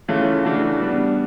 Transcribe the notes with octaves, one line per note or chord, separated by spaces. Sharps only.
C#3 E3 A3 C#4 F4
C#3 E3 A3 D4 F#4
G3 B3 D4